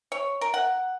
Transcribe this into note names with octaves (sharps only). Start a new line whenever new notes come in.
C#5
A#4
F#5